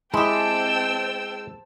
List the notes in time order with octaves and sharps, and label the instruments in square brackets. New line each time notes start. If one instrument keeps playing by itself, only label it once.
[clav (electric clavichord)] G#3 [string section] C4 A5 E6 [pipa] E4 G4 [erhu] G5